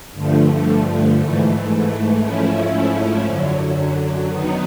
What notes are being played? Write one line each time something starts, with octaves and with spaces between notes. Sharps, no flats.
G2 D3 F3 A3
G#2 E3 A3
G#2 F3 A3 C#4 E4
F#2 D3 F#3
D#3 F#3 B3 D#4